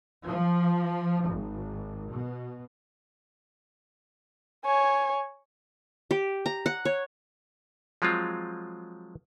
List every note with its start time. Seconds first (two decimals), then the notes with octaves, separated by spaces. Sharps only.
0.24 F3
1.26 G#1
2.09 B2
4.65 C#5 G#5
6.11 G4
6.46 A#5
6.66 F#5
6.85 C#5
8.02 F3 F#3 G#3 C4 F4